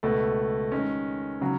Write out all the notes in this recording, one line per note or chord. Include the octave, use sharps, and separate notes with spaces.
C#2 B2 A3
D#3 G#3 C#4
C#3 F#3